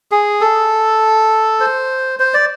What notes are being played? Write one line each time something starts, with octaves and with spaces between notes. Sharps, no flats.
G#4
A4
C5
C5
D5